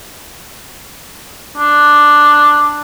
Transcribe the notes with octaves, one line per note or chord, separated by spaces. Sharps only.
D4